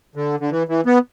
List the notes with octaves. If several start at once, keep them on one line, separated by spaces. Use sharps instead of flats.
D3
D3
E3
E3
B3